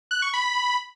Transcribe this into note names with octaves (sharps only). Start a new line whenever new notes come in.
F#6
C#6
B5